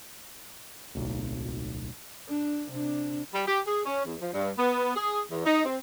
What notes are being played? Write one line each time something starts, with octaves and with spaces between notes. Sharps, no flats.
D1 B1
D4
C3 D4
G3
G4
G#4
C#4
E2
F3
G2
B3
G#4
E2
D#4
C4